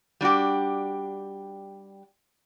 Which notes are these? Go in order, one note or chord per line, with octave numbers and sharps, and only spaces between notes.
G3 D4 F#4 G4